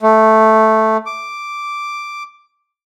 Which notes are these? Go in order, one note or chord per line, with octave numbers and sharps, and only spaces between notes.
A3
D6